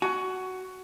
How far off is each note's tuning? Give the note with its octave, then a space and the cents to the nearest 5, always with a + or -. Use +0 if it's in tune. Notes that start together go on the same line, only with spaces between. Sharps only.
F#4 +10 G#5 +25